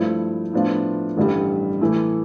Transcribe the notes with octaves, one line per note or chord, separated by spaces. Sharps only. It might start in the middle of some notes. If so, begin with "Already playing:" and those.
Already playing: G2 F3 A3 E4
A2 F3 B3 D4 F4
A1 G2 D3 G3
A2 E3 A3 E4